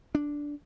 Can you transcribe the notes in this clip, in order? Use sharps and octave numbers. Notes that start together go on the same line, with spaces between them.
D4